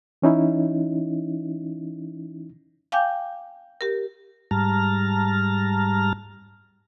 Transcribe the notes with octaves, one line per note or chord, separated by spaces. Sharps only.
E3 C#4 D#4 E4
F5 G5 G#5 D6 G6
G4 A#4
G#2 G3 A5 A#5 F6